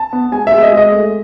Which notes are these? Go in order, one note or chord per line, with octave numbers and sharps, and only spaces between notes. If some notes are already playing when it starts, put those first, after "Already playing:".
Already playing: A5
B3
G#3 G#5
G#3 E5
D#5
G#3
D#5
A3